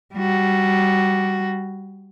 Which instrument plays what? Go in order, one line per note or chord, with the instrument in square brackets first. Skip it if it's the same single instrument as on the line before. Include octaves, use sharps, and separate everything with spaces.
[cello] G3 F#4